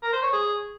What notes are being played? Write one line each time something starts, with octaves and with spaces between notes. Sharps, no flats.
A#4
C5
C#5
G#4